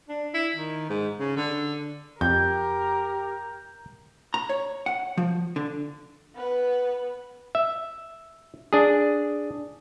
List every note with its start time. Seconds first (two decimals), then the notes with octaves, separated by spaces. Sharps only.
0.09 D4
0.34 E4
0.56 D#3
0.89 G#2
1.19 C#3
1.36 D3
2.21 F2 G4 A#4 G6
4.34 A#5
4.49 C#5
4.86 F#5
5.17 F3
5.56 D3
6.35 B3 B4
7.55 E5
8.73 D4 G#4